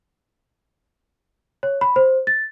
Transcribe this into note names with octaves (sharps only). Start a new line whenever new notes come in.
C#5
B5
C5
A6